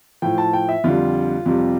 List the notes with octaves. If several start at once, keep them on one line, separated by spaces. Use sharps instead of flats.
A2 F3 G5
A5
G5
E5
F2 D3 G3 F4
F2 C3 G3